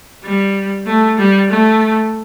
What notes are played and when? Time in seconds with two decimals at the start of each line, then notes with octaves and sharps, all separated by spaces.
0.24 G3
0.86 A3
1.18 G3
1.49 A3